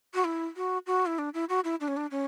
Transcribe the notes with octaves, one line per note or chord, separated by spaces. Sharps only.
F#4
E4
F#4
F#4
E4
D4
E4
F#4
E4
D4
C#4
D4
C#4